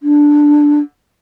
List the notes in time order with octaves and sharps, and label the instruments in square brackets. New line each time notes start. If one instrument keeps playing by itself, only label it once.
[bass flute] D4